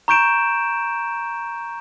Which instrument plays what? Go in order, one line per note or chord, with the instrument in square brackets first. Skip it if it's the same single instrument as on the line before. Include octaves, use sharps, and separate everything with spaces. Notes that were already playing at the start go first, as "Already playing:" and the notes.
[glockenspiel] A#5 C#6 G6 D7 E7